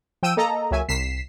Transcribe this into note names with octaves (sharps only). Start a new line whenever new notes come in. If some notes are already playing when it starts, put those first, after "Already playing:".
F3 G5 E6 D#7
A#3 A4 D#5 A#5
C#2 F#3 A#3 E5 G#5
C2 B6 C7 E7